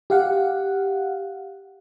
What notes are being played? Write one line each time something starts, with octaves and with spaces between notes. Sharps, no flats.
G4 F5 F#5